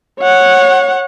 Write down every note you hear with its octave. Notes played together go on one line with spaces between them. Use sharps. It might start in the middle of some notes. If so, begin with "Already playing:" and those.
C#5 F#5